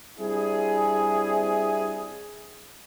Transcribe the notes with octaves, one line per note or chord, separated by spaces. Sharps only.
G3 C4 D4 E4 G#4